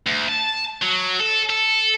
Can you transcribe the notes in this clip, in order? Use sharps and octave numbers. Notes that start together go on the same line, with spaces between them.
D2
A5
F#3
A4
A4